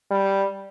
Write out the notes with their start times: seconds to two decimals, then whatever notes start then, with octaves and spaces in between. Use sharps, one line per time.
0.11 G3